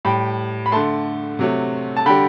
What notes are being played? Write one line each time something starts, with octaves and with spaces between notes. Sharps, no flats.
A2 G3 G5 B5
B5
D3 A3 A5 C6
C3 F#3 A3
A5
D3 G3 G5 B5